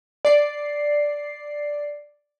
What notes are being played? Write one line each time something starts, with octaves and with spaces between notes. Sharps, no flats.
D5 C7